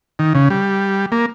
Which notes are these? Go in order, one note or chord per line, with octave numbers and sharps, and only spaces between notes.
D#3
C#3
G3
A#3